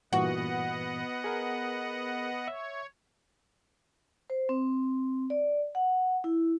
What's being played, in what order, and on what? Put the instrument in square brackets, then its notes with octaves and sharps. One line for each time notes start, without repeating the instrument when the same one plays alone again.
[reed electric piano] G2 A#2 E3 [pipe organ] B3 D#5 F#5 [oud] F#4
[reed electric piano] G#4 A#4
[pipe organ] C#5 [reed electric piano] E5
[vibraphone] C5
C4
D5
F#5
E4